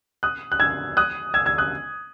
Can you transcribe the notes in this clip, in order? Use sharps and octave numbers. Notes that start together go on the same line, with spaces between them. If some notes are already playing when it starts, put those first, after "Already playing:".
D#6 F#6
F#6
E6 G#6
D#6 F#6
E6 G#6
E6 G#6
D#6 F#6